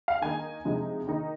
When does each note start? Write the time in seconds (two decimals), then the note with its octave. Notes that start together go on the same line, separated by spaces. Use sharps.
0.08 F5
0.22 D#3 A#3 D#4 G#5
0.65 C3 F3 G#3 D#4
1.07 D#3 A#3 D#4